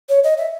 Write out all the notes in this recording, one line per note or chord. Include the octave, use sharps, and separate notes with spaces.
C#5
D#5
E5